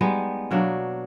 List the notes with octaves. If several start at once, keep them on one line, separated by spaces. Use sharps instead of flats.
G3 G#3 B3 D#4
B2 F#3 A#3 D4